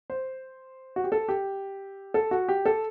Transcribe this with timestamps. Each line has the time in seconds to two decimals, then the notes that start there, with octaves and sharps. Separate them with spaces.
0.10 C5
0.96 F#4
1.04 G4
1.12 A4
1.28 G4
2.14 A4
2.31 F#4
2.48 G4
2.66 A4